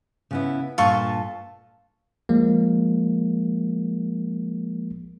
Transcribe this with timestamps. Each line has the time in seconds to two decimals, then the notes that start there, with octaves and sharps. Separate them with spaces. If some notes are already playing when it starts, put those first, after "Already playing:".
0.31 C#3 B3 E4
0.78 G2 A#2 F4 A4 A5 C#6
2.29 F3 G#3 A#3